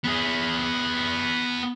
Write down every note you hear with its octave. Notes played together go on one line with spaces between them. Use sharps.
B3 G#4